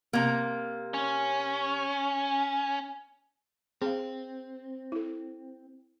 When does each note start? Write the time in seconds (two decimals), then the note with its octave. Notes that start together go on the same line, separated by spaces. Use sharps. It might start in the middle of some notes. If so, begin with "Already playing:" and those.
0.13 C3 A#3
0.94 C#4
3.82 C4 G#4 C5 F5
4.92 E4 A4